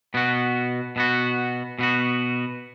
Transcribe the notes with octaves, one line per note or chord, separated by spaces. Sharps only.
B2 B3 F#4
B2 B3 F#4
B2 B3 F#4